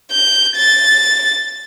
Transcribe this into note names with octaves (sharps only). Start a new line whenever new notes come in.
G6
A6